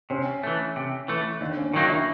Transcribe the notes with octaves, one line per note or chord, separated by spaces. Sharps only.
C3 C#4
E3 A3
C3
E3 A3
D#2 D4
C#4
D#3 F#3 A#3 D4 D#4
E4